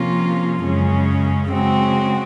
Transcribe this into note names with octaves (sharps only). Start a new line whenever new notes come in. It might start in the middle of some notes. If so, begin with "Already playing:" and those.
Already playing: C3 F3 A#3 C#4 F4
F#2 C#3 G#3 C#4
C#3 G#3 C4 F#4